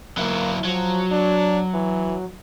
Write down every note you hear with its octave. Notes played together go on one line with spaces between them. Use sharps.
F#3 A#3 E4
F3 F#3
D4
E3